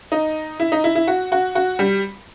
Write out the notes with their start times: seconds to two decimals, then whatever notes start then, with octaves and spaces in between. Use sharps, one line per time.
0.12 D#4
0.60 E4
0.72 D#4
0.84 E4
0.95 E4
1.07 F#4
1.32 F#4
1.55 F#4
1.79 G3